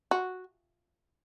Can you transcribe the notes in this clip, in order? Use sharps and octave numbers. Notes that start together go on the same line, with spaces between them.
F#4